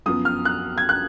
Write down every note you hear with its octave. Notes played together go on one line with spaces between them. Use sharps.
F#2 F3 B3 D#6
F6
F#6
G#6
F#6